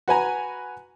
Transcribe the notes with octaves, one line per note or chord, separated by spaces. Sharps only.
F#4 B4 G#5 A#5